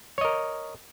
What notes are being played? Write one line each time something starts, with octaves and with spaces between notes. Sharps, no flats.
A#4 C#5 D#5